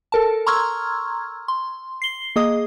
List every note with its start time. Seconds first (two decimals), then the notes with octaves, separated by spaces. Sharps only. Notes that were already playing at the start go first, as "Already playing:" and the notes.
0.12 A4 A#4 A5
0.47 A#5 C6 C#6 E6 F6 G#6
1.48 C6
2.02 C7 G7
2.36 A#3 G#4 D#5 D#6